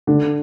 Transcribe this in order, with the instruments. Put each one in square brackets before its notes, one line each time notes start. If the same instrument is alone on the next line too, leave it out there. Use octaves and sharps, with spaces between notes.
[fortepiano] D3